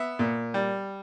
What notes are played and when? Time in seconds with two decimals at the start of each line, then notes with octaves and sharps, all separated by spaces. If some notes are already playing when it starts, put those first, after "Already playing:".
Already playing: B3 E5
0.19 A#2
0.54 G3